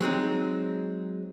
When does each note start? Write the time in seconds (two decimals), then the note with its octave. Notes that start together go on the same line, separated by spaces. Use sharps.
0.01 F#3 G#3 C4 D#4